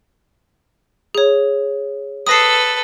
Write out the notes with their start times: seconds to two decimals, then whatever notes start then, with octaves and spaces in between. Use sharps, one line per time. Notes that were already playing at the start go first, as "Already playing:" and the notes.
1.15 G#4 C#5
2.27 A4 B4 D#6 A#6 C7